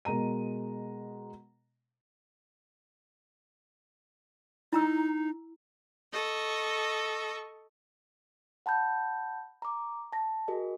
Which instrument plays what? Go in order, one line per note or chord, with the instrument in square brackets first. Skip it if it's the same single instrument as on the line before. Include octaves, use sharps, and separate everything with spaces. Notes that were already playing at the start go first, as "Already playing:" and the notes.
[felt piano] B2 G#3 A#4 A#5 D#7
[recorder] D#4 [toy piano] E4 A#5 E6
[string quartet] A4 D#5 C#6
[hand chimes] F#5 A5 B5 G6
A#5 D6
A5 A#6
F#4 G#4 A#4 D#5